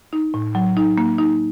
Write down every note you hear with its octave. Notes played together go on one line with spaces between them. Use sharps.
D#4
A2
F#3
D#4
A#3
D#4